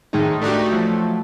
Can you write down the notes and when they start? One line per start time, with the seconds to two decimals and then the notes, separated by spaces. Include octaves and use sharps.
0.13 A2 D#3 G#3 A3 D#4
0.42 A3 D4 D#4 F#4 G4
0.72 F3 F#3 A3